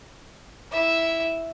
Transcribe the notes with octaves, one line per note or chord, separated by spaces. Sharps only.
E4 E5